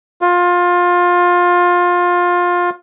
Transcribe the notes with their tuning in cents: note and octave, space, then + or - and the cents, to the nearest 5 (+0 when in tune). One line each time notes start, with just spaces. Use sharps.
F4 +20